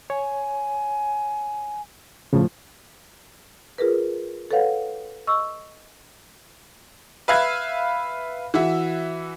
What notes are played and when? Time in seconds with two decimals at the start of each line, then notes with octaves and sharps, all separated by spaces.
0.10 C#5 G#5
2.33 A2 C#3 F3
3.78 F4 G#4 A#4 B4
4.51 A4 B4 C#5 F5 F#5
5.27 D#5 C#6 E6
7.28 B4 E5 F5 F#6 G#6
8.54 E3 F#4 E5